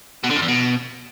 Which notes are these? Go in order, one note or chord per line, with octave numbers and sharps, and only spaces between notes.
B2
D3
F2
E2
B2